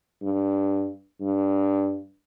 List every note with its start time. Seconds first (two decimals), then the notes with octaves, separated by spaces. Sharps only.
0.22 G2
1.21 G2